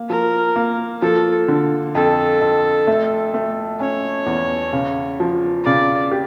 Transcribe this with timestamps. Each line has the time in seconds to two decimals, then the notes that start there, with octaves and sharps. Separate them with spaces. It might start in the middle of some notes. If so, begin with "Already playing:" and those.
Already playing: A#3
0.09 F3 A#4
0.56 A#3
1.02 F3 A4
1.48 D3
1.95 F2 A4
2.41 F2
2.87 A3
3.34 A3
3.80 C#4 C#5
4.26 E2
4.73 C#3
5.20 F3
5.65 C#3 D5
6.12 G4